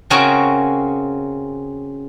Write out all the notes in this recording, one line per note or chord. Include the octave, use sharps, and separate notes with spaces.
C#3 C4 C#4 F#4 G#4 A#4